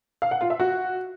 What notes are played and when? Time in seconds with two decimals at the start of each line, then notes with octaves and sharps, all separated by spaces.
0.22 F5
0.31 F#5
0.41 F4
0.50 E5
0.60 F#4